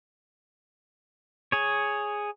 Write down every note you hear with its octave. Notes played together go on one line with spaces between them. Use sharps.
G#4 C#5